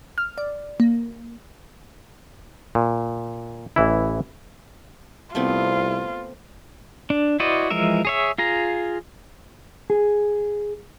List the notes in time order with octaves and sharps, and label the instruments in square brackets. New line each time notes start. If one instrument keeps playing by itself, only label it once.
[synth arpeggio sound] F6
D5
A#3
[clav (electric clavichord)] A#2
A1 E3 E4
[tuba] C2 [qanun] A3 B3 C4 [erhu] F4
[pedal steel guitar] D4
E4 F#4 C5 D5 D#5
E3 F3 G#3 A#4 E5
G#4 C#5 E5
F4 G#4 A#5
[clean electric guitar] G#4